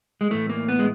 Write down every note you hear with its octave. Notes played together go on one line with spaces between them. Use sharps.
G#3
A2 E3 A3
A#3
B3
G#3